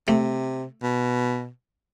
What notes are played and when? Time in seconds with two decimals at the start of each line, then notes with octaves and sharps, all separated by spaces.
0.08 C3 A3
0.83 B2